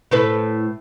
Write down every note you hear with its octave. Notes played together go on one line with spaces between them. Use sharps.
A2 A4 B4